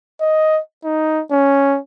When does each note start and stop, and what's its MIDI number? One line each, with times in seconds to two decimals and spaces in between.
0.21 0.60 75
0.84 1.22 63
1.31 1.78 61